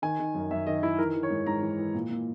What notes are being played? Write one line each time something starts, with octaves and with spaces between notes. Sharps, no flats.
D#3 G#5
D#3
F#2
F#2 E5
D#3 D#5
D#3 E4
E3 A#4
E3
C#5
G#2
G#2 A#5
E3
E3
A#2
A#2